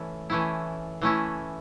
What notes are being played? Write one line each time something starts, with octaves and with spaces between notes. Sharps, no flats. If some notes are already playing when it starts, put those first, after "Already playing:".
Already playing: E3 A3 C#4 E4
E3 A3 C#4 E4
E3 A3 C#4 E4